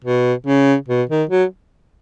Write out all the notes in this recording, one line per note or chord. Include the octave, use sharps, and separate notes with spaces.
B2
C#3
B2
D#3
F#3